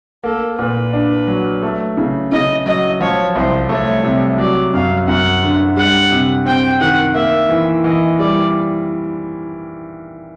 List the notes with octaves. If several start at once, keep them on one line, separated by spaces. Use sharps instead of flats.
A#3 A4
A#2 B4
D4
F#3
A3
C#3
C#3 D#5
F#3 D#5
F3 C#5
C2 C5
A3 C#5
C3
F#3 D5
F#2 F5
F#2 F#5
D3
G3 F#5
C3
C4 G5
D#3 F#5
A#3 E5
E3
E3 D#5
G3 D5